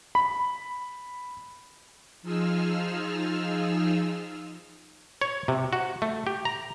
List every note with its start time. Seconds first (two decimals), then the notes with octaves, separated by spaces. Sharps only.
0.15 B5
2.22 F3 D#4 F4 G#4 E6 F6
5.21 C#5
5.48 C3
5.73 F#4
6.02 A3
6.27 G4
6.45 A#5